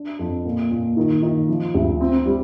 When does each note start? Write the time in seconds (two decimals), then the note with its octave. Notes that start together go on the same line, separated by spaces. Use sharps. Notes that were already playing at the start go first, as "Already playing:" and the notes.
Already playing: D4
0.19 F2
0.45 A#2
0.71 A#2
0.97 D#3
1.22 D#3
1.49 F3
1.74 D2
2.01 C4
2.26 G3